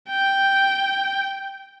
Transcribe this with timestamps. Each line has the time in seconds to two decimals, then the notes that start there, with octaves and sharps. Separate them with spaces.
0.09 G5